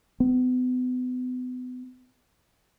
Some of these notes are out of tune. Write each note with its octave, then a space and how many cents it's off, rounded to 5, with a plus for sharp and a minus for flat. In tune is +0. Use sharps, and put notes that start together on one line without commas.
B3 +35